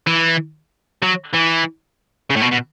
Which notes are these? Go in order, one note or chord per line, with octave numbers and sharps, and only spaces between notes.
E3
F#3
E3
C#3
A2
B2
B2